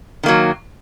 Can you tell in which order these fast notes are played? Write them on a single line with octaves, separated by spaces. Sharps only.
D#3 A#3 F#3